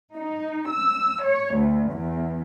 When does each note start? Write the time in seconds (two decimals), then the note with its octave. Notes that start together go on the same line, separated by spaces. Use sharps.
0.15 D#4
0.69 E6
1.25 C#5
1.56 D2
1.93 E2